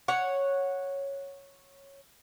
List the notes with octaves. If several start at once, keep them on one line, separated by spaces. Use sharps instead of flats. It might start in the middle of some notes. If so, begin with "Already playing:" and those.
C#5 F#5